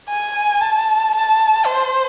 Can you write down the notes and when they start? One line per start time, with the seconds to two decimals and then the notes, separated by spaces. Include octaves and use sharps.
0.09 G#5
0.61 A5
1.15 A5
1.66 C5